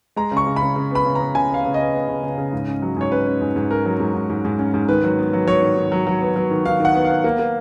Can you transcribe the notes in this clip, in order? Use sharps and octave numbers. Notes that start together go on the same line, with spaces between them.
G#3 A#5
C#3
C#6
C#3
B5
C#3
C#3
B3 B5
C#3
B3 A#5
C#3 G#5
B3 F5
C#3
D#5
B3
B3
C#3
C#3
C#3
G#2
C#4
F#3
G#2 C#5
C#4 B4
C#4
G#2
G#2
C#4 A#4
F#3
G#2
G#2
G#2
G#2
C#4
G#2
D#3 B4
F#3
B3
F#3
F#3 C#5
D#3
D#3
F#3
F#3
B3
F#3
D#3
D#3 F5
D#3
F#5
B3
F5
B3
A#3
A#3